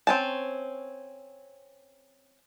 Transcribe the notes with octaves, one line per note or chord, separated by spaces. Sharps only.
C4 C#4 A5